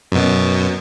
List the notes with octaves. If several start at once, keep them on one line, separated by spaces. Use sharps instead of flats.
F#2 B2